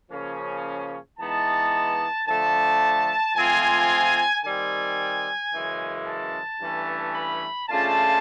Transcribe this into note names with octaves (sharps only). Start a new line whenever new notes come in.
C#3 F3 A#3 C#4
E3 G#3 B3 D#4 A5
D3 F3 A3 A5
F3 A3 C4 F4 G#5
D#3 G3 C4 G#5
F#2 C#3 E3 G#3 C#4
A5
G2 E3 A3 C#4
B5
C#3 F3 A3 D4 F4 A5